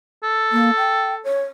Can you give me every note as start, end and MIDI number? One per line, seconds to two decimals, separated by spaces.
0.24 1.29 69
0.52 0.71 58
0.77 1.15 79
1.24 1.42 73